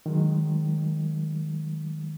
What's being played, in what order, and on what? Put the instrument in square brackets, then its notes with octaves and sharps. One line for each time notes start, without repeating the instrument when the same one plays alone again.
[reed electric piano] D#3 F#3 G#3